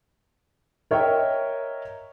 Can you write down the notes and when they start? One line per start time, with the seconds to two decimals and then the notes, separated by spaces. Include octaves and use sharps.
0.91 A#4 C#5 D#5 E5 G5